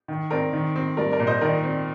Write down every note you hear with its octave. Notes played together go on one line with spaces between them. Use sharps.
D#3
C4 A#4 D5
D#3
C4
G3 A#4 D5
A#4 D5
A#2
C5 D#5
D#3 A#4 D5
C4